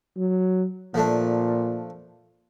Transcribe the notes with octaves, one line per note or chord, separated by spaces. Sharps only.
F#3
A#2 F3 A3 D4